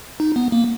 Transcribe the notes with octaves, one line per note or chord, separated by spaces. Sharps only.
D#4
B3
A#3